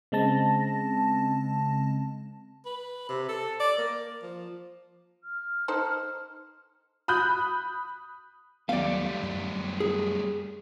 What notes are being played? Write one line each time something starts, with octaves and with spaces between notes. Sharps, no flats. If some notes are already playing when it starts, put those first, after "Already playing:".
C#3 G#3 C4 A5 A#6
B4
C3
A4
D5
A#3
F3
F6
D#4 A4 C5
B5 D#6 F#6 G6
D#2 F#3 G3 A3 B3 D5 F5
F#2
G#4